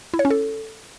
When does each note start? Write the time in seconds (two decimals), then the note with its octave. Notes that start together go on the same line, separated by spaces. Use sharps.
0.14 E4
0.19 C#5
0.25 C#4
0.30 A4